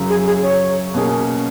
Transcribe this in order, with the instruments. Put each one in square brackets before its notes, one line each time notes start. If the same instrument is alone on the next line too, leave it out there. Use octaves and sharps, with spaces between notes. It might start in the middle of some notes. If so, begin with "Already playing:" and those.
Already playing: [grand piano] F#2 C#3 F#3
[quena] G#4
G#4
C#5
[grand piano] B2 A#3 C#4 G#4